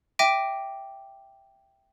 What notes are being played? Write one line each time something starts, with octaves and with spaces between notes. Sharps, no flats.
E5 G5 D6 A#6 D7 D#7